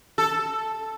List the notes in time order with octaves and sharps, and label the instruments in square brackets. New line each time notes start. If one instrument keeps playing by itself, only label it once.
[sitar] A4